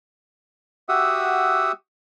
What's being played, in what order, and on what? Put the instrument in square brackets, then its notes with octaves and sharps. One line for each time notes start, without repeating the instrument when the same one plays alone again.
[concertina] F#4 G4 E5 F#5 D#6 E6